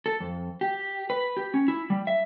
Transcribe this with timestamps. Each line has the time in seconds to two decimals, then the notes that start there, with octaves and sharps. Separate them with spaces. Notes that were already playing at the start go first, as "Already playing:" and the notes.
0.06 A4
0.20 F2
0.61 G4
1.10 B4
1.37 G4
1.54 C#4
1.68 E4
1.90 G3
2.07 E5